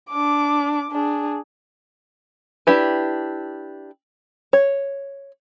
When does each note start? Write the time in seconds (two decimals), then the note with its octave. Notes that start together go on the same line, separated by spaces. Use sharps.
0.10 D4 D6
0.92 D4 G#4
2.67 D4 E4 G4 B4
4.53 C#5